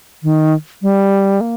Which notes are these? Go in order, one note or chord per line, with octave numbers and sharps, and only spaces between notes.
D#3
G3
A#3